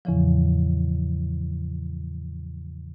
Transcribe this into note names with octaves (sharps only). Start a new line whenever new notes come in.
E2 A2 C#3 E3 F3